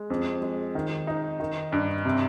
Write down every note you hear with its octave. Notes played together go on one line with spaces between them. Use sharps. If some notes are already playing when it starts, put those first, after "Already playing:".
Already playing: G#3
F2
G#3
D#3
D#4
D#3
G2
C3